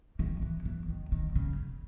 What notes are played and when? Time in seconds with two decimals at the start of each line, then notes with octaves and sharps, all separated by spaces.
0.19 D#3
0.42 E3
0.65 E3
0.89 D#3
1.12 D#3
1.35 C#3